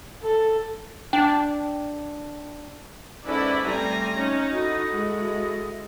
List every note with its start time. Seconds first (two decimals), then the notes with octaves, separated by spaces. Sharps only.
0.22 A4
1.13 D4 G5
3.25 G#2 C#4 E4 F#4 A4 B4 D5
3.65 G3 A3 C4 G#5 A#5
4.16 C#4 D#4
4.53 E4 F#4 A4 D#5
4.93 G#3